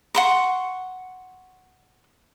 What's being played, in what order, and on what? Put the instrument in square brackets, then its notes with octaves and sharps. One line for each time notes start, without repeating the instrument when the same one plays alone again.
[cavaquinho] F#5 C6 C#6